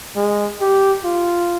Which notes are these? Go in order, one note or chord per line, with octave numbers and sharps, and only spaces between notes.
G#3
G4
F4